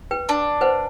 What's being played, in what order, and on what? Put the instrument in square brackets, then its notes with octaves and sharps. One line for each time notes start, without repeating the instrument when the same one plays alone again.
[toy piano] B4 G5
[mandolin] D4
[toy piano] B4 C5 F#5